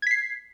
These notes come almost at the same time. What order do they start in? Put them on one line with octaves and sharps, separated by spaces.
G#6 B6 C7